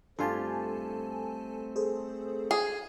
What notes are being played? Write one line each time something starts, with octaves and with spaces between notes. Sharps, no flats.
G2 A3 C4 F4 G4 A4 G#5 A5
G#4 A4 C5
G#4